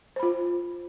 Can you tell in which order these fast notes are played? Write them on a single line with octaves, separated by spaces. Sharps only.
C5 B5 F4